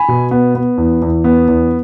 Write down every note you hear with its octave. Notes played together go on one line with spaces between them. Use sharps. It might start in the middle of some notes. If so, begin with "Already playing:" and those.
Already playing: G#5 B5
B2
B3
B3
E2
E2
B3
E2